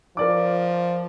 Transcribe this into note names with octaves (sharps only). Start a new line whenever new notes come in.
F3 A#4 D5 D6